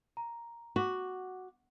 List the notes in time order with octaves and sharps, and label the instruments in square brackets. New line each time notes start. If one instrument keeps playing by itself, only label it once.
[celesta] A#5
[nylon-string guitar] F#4 [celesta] F#5 D6